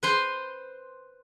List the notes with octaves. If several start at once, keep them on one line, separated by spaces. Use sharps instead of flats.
B4 C5 C6